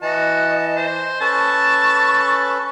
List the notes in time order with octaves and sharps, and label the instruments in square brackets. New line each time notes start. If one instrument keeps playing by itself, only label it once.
[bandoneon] E3 A5 [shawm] F#4 [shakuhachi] D#5
[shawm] C5
[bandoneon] C#4 A4 B4 [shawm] A5 [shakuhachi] C#6